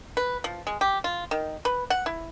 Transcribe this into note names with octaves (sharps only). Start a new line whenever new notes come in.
B4
F3
G#3
G4
F4
D#3
B4
F#5
E4